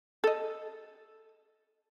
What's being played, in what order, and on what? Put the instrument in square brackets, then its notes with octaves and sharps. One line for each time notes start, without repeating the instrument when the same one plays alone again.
[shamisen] A4 D#5